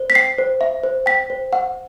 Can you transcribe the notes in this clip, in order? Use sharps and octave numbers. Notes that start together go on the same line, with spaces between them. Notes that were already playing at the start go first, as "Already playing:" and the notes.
Already playing: C5
B6
G5 C7
C5
E5
C5
G5 B6
C5
F#5